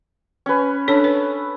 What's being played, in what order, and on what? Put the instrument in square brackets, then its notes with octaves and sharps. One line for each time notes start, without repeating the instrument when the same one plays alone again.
[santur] C#4 B4
[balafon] D4 C#5 [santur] A4
[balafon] B4